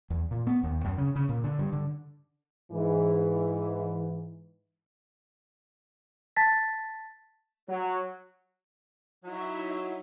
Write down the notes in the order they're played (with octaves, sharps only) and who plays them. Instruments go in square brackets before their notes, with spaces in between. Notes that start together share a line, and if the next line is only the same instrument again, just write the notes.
[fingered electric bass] E2
A#2
B3
D#2
F#2
C#3
C#3
A#2
D3
G2
D3
[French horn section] G#2 E3
[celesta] A5 A6 B6
[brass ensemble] F#3
[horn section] F#3 [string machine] D#4 E4 E5